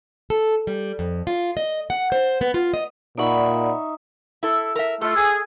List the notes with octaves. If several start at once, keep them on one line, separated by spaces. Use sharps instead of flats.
A4
G3
F2
F4
D#5
F#5
C5
B3
F4
D#5
A#2 D#4 D5 E5 F#5 B5 C#6
E4 A4
A#4 E5
A3 F4 A4
G#4 G#5